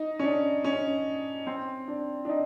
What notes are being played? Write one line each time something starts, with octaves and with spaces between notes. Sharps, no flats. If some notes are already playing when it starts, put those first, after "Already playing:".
Already playing: D#4
C#4
D4
C#4
C4
D4
D4
D#4